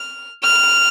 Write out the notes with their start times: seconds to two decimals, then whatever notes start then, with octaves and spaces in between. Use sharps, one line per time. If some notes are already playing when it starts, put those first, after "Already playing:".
Already playing: F6
0.43 F6